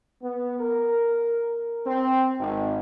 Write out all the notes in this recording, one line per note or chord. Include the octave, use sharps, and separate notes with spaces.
B3
A#4
C4
G#1